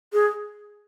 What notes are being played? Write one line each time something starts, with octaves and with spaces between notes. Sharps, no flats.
G#4